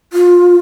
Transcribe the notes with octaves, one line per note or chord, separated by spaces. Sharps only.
F4